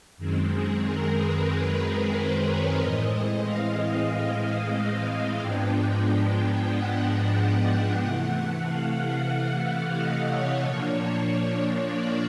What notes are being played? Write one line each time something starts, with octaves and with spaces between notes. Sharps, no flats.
F#2 D#3 G#3 C4
G#4
A#4
B4
B4
C5
C#5
A2 E3 G#3 C4 D#5
F5
G#2 F3 G#3 B3 D4 G5
F#5
F#5
C3 E3 A3
F5
D#5
C#5
A#2 F3 A#3 D4
D5